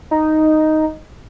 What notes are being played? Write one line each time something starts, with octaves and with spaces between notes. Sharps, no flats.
D#4